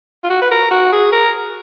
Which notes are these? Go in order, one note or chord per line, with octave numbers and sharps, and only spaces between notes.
F4
F#4
B4
A#4
F#4
G#4
A#4